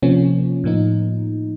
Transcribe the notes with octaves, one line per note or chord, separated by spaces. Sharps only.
C3 F3 A#3 C#4
A2 F3 A#3 D#4